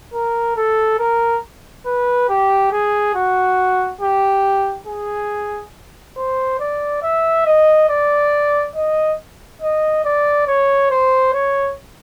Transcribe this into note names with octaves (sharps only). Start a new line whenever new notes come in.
A#4
A4
A#4
B4
G4
G#4
F#4
G4
G#4
C5
D5
E5
D#5
D5
D#5
D#5
D5
C#5
C5
C#5